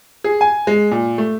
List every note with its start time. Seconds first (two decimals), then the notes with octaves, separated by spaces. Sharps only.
0.24 G#4
0.41 G#5
0.67 G#3
0.91 A#2
1.18 A3